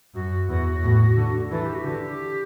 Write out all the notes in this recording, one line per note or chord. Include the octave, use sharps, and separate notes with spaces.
F#2 F#4
E2
A2
D3
E3 A4
G4
F#4
D3 G4